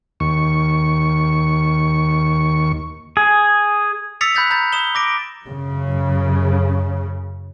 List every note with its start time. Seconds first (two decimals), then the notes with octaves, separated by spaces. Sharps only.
0.20 D#2 C#6
3.17 G#4
4.21 D#6 E6 A6 B6 C#7 F7
4.35 B5 F#6 G6 A6 B6
4.50 A#5 G6 A6
4.72 D#6 E7 G7
4.95 D6 A#6 D7
5.46 F#2 C#3